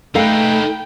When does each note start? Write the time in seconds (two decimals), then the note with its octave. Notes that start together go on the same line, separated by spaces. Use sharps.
0.15 A3 D#4 A4 B4 F5 G5